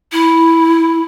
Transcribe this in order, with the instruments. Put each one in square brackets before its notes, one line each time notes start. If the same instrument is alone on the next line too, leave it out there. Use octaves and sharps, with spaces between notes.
[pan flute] E4